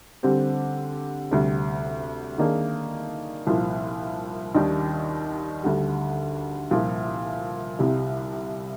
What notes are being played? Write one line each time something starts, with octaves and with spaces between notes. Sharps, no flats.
D3 G3 C4 G4
D2 C3 G3
D#3 A#3 D4 G#4
C2 A#2 F3
D#2 D#3 G3 D4
D2 D3 G3
C2 A#2 F3
C2 C3 G3